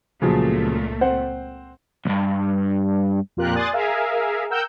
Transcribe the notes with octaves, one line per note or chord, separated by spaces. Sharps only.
C#2 A#2 C#3 F3 F#3 A3
C4 C5 F#5
B1 G2
F2 A#2 F4 G4 A#4 F#6
D5 G#5 C6 D#6 F#6 A6
G#4 A#4 E5 F5 G#5
A#4 F#5 G5 E6 G6